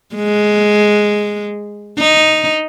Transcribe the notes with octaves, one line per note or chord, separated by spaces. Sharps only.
G#3
D#4